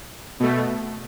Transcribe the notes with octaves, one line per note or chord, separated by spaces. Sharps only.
B2 A3